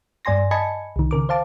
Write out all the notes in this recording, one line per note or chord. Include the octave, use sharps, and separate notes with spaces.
G2 D5 G#5 C6 A#6
D#5 G#5 A5 B5 G#6 C#7
C2 D#3
C#3 A#4 D6
C5 F5 A5 D6